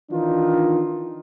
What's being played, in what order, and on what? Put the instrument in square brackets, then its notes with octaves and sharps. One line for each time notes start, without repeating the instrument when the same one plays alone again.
[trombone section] D#3 E3 D4 D#4 F4